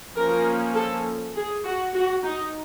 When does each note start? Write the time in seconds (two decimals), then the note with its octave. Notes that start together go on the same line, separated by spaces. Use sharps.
0.16 F3 A#3 C#4 A#4
0.75 A4
1.35 G#4
1.64 F#4
1.94 F#4
2.24 D#4